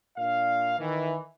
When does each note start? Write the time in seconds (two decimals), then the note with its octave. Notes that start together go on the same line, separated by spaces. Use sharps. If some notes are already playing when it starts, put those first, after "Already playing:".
0.18 A#2 D4 F5
0.79 D#3 E3